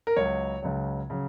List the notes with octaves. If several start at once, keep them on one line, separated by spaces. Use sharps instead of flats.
A#4
C#2 C#3 F#3 C#5
C#2 C#3 F#3
C#3 F#3